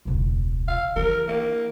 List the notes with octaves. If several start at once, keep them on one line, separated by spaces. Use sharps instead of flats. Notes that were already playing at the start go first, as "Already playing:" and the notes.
E1 C#2
F5
E3 A#4
A#3